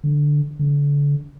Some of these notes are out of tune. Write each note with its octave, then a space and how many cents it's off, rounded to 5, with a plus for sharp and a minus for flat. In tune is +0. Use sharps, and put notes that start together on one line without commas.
D3 +0
D3 -35